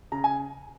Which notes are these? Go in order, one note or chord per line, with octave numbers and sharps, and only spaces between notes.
C#3 A#5
G#5